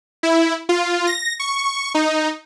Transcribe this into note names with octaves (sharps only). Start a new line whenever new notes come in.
E4
F4
A#6
C#6
D#4